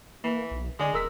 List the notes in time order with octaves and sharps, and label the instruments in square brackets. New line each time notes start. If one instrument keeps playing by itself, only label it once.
[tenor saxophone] E3 [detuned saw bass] A#3
[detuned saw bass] B1
[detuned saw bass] D3 [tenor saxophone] G#3 [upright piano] G#4 D5 G#5
[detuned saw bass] D#1 [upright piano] A#4 E6 B6